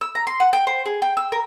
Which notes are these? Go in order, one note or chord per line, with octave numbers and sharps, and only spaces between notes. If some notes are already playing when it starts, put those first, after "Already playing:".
E6
A#5
C6
F#5
G5
C5
G#4
G5
E6
A#4